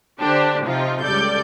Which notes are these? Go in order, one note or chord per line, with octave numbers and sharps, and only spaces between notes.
D3 D4 G4 C5
C3 F3 D#4 F4
C#2 G3 A4 D5 G6